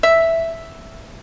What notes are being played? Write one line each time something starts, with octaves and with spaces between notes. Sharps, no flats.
E5